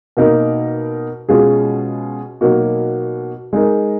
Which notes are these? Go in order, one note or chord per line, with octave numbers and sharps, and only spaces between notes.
B2 A#3 D#4 A#4
B2 G#3 C#4 F4 G#4
B2 F#3 A#3 D#4 F#4
G#3 D#4 A#4